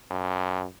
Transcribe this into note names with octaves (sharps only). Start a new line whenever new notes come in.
F#2